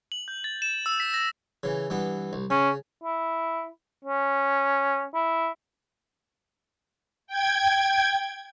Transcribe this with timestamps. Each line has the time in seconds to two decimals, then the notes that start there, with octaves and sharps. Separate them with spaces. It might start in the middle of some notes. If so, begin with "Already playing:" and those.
0.12 F#7
0.28 G6
0.44 A6
0.62 E7
0.86 E6
1.00 B6
1.14 A#6
1.63 C#3 E3
1.90 G2 E3 B3
2.33 C2
2.50 C#3 C#4
3.04 E4
4.05 C#4
5.14 E4
7.27 G5 G#6